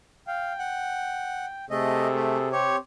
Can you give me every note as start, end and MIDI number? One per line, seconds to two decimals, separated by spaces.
0.27 0.53 77
0.27 1.65 79
0.59 1.46 78
1.71 2.72 48
1.71 2.07 57
1.71 2.49 68
1.71 2.49 69
1.71 2.07 75
2.14 2.38 57
2.52 2.78 60
2.52 2.76 67
2.52 2.76 73